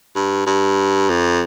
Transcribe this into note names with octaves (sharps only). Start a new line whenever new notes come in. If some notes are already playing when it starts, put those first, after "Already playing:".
G2
G2
F2